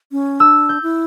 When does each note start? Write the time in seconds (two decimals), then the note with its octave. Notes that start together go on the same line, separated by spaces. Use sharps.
0.12 C#4
0.40 D4 E6
0.69 G6
0.83 E4